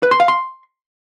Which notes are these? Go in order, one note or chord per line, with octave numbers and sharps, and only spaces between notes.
B4
C6
F5
C6